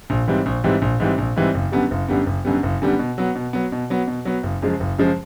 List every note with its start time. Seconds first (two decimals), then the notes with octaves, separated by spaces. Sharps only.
0.10 A#1
0.28 G#2 E3 G3 C4
0.46 A#1
0.64 G#2 E3 G3 C4
0.82 A#1
1.00 G#2 E3 G3 C4
1.18 A#1
1.36 G#2 E3 G3 C4
1.54 F#1
1.72 F#2 D3 G3 B3
1.91 F#1
2.08 F#2 D3 G3 B3
2.26 F#1
2.45 F#2 D3 G3 B3
2.63 F#1
2.82 F#2 D3 G3 B3
2.99 B2
3.18 F#3 B3
3.35 B2
3.53 F#3 B3
3.72 B2
3.90 F#3 B3
4.07 B2
4.25 F#3 B3
4.43 F#1
4.62 F#2 C#3 F3 G#3
4.80 F#1
4.98 F#2 C#3 F3 G#3